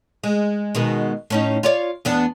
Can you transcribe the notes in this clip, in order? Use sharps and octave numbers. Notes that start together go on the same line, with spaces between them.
G#3
B2 D#3 G#3
A2 C#4 D#4
F4 C#5 D5
E2 B3 D4